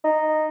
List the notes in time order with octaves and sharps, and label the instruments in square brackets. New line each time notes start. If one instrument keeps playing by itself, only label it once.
[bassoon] D#4